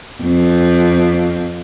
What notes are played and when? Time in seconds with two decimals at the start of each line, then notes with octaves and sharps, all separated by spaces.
0.23 F2 C4